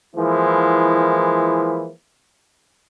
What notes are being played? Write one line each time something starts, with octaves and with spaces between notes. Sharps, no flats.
E3 F3 G#3 A#3 E4